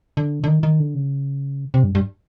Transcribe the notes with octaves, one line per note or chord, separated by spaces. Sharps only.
D3
D3
D#3
D#3
D3
C#3
C3
G2
G2